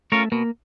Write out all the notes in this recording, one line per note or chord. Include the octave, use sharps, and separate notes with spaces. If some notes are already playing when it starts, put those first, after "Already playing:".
A3 C#4 F4 A#4 C#5
B2 A#3